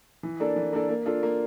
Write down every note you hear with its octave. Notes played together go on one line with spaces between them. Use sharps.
E3
A#3 D4 A4 D5
E3
A#3 D4 A4 D5
A#3
D4 F4 A4
A#3